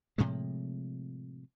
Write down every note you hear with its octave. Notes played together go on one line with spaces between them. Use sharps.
A2 C3 F3 G#3